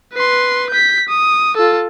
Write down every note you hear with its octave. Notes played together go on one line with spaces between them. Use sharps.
B4 C6
G6 B6
D#6
F4 A4